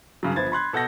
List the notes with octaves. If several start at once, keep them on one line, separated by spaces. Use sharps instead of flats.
G2 C#3 F#3
G1 F3 B3 C5 G#6 A6
B5 C6 F#6 G#6
B2 A4 F#5 G6 A#6